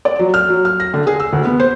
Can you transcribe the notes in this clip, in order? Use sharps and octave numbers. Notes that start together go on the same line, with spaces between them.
D5
F#3
F6
F#3
F6
A#6
D3
G#4
E6
D2
B3
C5